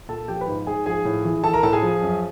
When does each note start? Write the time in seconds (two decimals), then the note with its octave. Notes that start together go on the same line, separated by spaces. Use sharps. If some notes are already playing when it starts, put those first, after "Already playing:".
0.08 A#2 A4 A5
0.28 F3 G4 G5
0.41 B4 B5
0.47 G#2
0.67 G#2 G#4 G#5
0.86 F3 G#4 G#5
1.05 A2
1.25 E3
1.44 E3 A4 A5
1.53 A#4 A#5
1.63 A2 A4 A5
1.73 G#4 G#5
1.82 F3
2.02 F#2